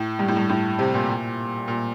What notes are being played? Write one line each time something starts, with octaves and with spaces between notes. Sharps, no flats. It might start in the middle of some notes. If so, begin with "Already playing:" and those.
Already playing: A2
G2
A2
G2
A2
C3
A#2
A#2